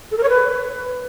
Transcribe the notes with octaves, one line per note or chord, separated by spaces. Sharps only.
A4
A#4
C#5
B4